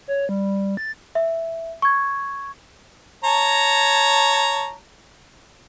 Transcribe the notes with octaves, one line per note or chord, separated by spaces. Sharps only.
C#5
G3
A6
E5
C#6 G#6
C#5 A5 A#5